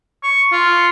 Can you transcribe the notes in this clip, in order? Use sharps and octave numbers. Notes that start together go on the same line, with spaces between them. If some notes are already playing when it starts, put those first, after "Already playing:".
C#6
F4